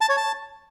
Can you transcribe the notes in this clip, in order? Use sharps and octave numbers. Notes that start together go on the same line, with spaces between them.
A5
C#5
A5